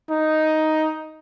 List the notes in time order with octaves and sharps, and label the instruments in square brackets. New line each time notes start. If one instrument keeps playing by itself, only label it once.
[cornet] D#4